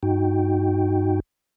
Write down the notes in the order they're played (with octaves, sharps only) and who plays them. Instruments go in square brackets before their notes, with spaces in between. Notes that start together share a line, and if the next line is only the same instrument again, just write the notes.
[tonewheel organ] G2 D#4 F#4 G5